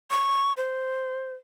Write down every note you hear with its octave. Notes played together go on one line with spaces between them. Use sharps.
C#6
C5